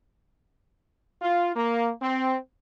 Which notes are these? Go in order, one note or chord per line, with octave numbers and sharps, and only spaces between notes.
F4
A#3
C4